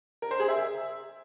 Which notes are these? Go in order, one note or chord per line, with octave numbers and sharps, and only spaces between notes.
A#4
C5
G#4
E5